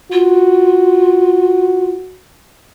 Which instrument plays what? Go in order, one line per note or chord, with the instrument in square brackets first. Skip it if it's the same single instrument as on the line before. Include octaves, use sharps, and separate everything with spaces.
[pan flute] F4 [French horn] F#4